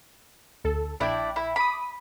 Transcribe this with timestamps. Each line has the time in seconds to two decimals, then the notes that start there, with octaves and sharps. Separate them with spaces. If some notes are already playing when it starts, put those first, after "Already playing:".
0.64 D2 A4
1.00 A#1 D4 E4 D5 G5
1.36 E4
1.56 B5 D6 D#6